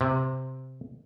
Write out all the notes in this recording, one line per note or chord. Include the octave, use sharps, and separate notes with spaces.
C3